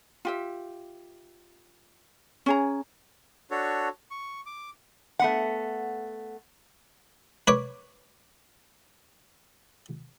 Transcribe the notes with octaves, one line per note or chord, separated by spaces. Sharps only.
F4 G4 E5
C#4 G#4 A#5
D4 F#4 A4 C#5
C#6
D6
A3 B3 F#5
B4 C#5 D6